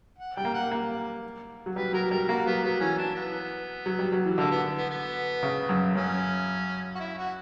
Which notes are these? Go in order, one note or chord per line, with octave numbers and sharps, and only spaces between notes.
F#5
G3 G5
A#3
F#5
A#3
F#3
G3 B4
F#3 A#4
G3 A#4
A#3 F#4
F#3 B3
F#3 B3
E3 C#4
D4
B3
F#3
G3
F#3
E3
D3 A#3
B3
B3
B3
C#3
F#2
F#2 C#4
F#4
E4
F#4